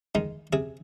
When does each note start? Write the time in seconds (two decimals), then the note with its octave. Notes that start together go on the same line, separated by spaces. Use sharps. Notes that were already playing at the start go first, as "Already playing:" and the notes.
0.15 D#3 G#3 D#4
0.53 C3 G#4